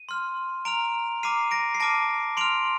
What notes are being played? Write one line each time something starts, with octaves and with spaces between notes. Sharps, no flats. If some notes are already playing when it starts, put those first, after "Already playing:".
Already playing: D#7
C6 F6
A#5 F6 D7 F7
A#5 D6 F6 C7 D#7
A#6 D7
C7
A5 D6 F6 A#6 D7
C6 F6 D7 F7